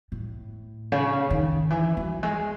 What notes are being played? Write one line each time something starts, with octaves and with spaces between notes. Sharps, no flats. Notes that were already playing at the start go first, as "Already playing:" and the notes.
A2
C#3
D#3
E3
F#3
G#3